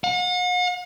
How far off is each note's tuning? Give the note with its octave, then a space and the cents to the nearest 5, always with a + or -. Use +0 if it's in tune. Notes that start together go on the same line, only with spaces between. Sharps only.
F#5 -45